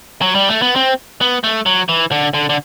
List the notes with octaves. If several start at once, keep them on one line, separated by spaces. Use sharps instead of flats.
F#3
G3
A3
B3
C4
B3
A3
F#3
E3
D3
D3
D3